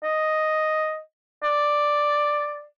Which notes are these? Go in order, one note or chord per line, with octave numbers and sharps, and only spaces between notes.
D#5
D5